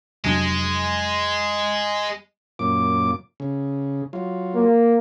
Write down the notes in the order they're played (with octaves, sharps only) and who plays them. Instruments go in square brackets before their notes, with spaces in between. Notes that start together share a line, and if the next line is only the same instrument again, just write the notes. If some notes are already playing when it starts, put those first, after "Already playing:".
[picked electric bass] F1 F#3 D4 [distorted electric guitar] G#3
[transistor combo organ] F#2 A#2 D6
C#3
F#3 F4
[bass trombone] A#3